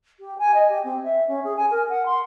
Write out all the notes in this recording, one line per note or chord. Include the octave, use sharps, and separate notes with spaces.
G4
G#5
D#5
G4
C4
E5
C#4
G#4
G#5
A#4
F#5
C6